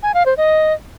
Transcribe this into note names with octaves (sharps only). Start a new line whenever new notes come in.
G#5
F5
C5
D#5